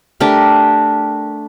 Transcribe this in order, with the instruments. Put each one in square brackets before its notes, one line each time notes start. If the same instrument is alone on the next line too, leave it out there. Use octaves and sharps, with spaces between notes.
[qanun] A3 D4 G4 A#4